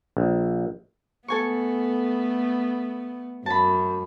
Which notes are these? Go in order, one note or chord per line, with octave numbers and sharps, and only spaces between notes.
A#1
A3 B3 A4 G#5 C#6
F#2 A5 B5